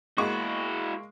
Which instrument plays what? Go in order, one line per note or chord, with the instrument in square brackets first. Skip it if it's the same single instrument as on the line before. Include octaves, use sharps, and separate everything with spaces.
[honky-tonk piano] G#3 A#3 C#6 [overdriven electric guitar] E4 F#4